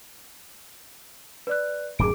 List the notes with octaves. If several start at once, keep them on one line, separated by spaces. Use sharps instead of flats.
B4 D5 F#6
D1 F#2 D#3 G#4 D6 D7